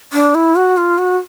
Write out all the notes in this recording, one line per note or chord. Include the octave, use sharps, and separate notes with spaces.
D4
E4
F#4
F4
F#4